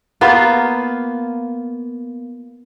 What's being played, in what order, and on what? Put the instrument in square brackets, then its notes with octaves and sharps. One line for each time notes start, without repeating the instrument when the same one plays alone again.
[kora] A#3 B3 F4